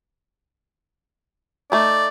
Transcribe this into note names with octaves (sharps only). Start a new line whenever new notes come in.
A3 D#4 D5